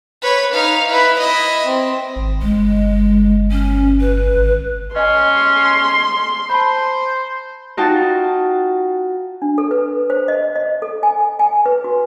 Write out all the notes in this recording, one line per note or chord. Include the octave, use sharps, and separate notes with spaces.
B4 C#5
D#4 F5
E4 B4
E4 D#5
C4
G#1
G1 G#3
C#4
B4
G#1
C#4 D#5 G#5 C6
C5 A5 B5
D#4 F4 F#4 G5 A5
D4
A4
B4
C5
D#5
D#5
A4
G#5
G#5
B4
F#4